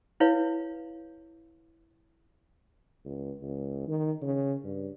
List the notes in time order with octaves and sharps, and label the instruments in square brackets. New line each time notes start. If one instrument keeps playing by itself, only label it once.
[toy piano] E4 B4 C#5 F5
[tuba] C#2
C#2
D#3
C#3
G2